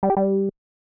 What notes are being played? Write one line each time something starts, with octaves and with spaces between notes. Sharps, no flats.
G3
G4
G3